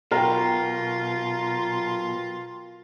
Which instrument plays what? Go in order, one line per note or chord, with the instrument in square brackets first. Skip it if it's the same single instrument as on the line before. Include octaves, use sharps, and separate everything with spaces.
[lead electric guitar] B1 B2 [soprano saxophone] F4 [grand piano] A#4 G5